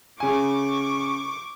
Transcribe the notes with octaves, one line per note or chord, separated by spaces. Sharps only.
C#3 G#5 C#6 D6